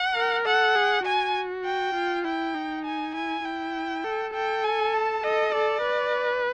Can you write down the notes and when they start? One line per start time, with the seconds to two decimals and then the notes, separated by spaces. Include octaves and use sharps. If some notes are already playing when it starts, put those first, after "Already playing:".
Already playing: F#5
0.16 A#4
0.45 A4 F#5
0.75 G#4
1.05 F#4 G#5
1.65 G5
1.95 F4
2.25 E4 G5
2.55 D#4
2.85 G#5
3.14 E4 G#5
3.44 E4 G5
4.04 A4
4.34 A4 G5
4.64 G#5
4.93 A5
5.24 A4 D#5
5.53 A4 D5
5.83 B4